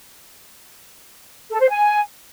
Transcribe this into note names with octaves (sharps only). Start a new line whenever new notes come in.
A4
C5
G#5